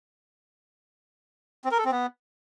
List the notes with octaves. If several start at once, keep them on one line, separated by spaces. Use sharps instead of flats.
C4
A#4
A4
C4
B3